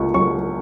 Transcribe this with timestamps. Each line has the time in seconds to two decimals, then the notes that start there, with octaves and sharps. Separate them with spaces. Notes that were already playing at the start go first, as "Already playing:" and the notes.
Already playing: C#2 C#6
0.14 F#3 C#6